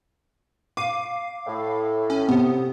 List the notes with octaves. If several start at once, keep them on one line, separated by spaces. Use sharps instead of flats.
F5 D6 D#7
A2
C#4
C3 B3